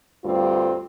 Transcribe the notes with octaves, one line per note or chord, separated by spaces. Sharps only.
D2 G2 G3 C4 F4